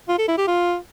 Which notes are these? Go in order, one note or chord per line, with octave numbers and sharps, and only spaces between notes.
F4
A4
E4
G4
F4